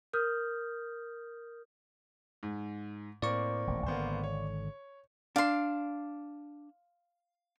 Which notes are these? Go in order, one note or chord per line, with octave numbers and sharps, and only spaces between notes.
A#4 D#6 F6 G6
G#2
A2 A#3 C4 D5 C#6
D#1 A1
G#1 D3 A#3 B3 C5
C#5
D4 F5 C6